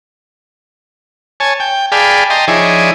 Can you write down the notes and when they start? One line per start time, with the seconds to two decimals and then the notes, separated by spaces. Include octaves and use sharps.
1.40 C#5 G#5 A5
1.60 G5
1.92 G#4 D5 F5 G5 A5 B5
2.30 D#5 G5 A5 A#5 C6
2.48 F3 D#4 E4 G#4 C#5 D5